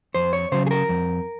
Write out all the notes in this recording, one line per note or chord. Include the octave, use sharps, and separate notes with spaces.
F2 C5
C#5
C#3 F#3 C5
G#4
A#4
F2